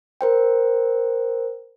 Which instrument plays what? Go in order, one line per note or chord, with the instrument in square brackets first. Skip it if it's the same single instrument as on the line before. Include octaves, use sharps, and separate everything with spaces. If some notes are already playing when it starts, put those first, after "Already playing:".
[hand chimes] A#4 C5 G5